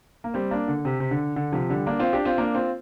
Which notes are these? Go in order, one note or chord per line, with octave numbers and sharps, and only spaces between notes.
A#3
G3 C4
A#3 D4
D3
C3
C3
D3
D3
C3 F3
D3 G3
A#3 D4
C4 F4
D4 G4
C4 F4
A#3 D4
C4 F4